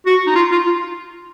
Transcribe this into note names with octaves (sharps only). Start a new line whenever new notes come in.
F#4
D#4
F4
F4
F4